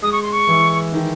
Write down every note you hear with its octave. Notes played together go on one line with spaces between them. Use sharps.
G#3 D#6
C#6
C6
C#6
E3
D#3